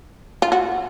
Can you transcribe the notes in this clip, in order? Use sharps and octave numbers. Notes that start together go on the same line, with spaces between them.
F4
F#4